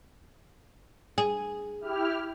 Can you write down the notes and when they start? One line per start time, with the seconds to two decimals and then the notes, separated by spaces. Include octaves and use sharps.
1.18 G#4
1.81 E4 G4 F6